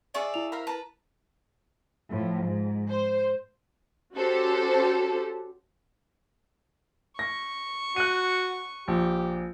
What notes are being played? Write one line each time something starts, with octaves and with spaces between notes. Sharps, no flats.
D#4 G#4 D5 E5 F5 C#6
E4 F7
A#4 C5 F5 B5
B4 A5 A#5
A2 F3
G#2
C5
C#4 F#4 G4 A4 C5
C#6 A#6
F#4 F#6 D#7
A#1 G4